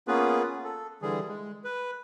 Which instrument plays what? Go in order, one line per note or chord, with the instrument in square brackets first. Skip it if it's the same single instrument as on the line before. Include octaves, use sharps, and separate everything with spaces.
[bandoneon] A#3 B3 C#4 F4 G#4 B4
A4
D3 E3 G3 G#4
G#3
B4